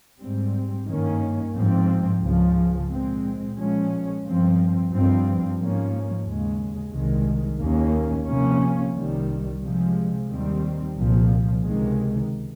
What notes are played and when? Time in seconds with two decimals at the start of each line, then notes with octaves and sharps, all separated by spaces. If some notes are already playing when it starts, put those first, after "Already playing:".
0.20 G#2 G3 C4
0.86 G2 D#3 A#3 C#4
1.54 G#2 F3 C4
2.21 C#2 C#3 F3
2.88 A#2 G#3 C4
3.56 A#2 F3 G#3 C#4
4.23 G2 F3 C4
4.90 G2 F3 C4
5.58 G#2 F3 A#3 C#4
6.25 D#2 C#3 G#3
6.91 C2 C3 D#3 G#3
7.60 D#2 D#3 A#3 C#4
8.27 C3 F3 A#3 C#4
8.94 C2 C3 D#3 G3
9.61 C3 F3 G#3
10.28 D#2 D#3 G3 C4
10.96 C2 A#2 F3
11.63 C#2 C3 D#3 G#3